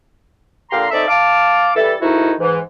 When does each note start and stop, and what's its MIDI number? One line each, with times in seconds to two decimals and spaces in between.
0.71 0.85 46
0.71 0.85 50
0.71 0.85 67
0.71 0.85 77
0.71 0.85 82
0.71 0.85 84
0.90 1.04 60
0.90 1.04 63
0.90 1.04 69
0.90 1.04 74
0.90 1.04 76
1.08 1.70 77
1.08 1.70 81
1.08 1.70 86
1.75 1.94 52
1.75 1.94 55
1.75 1.94 64
1.75 1.94 69
2.00 2.32 44
2.00 2.32 51
2.00 2.32 57
2.00 2.32 63
2.00 2.32 64
2.00 2.32 66
2.40 2.58 44
2.40 2.58 52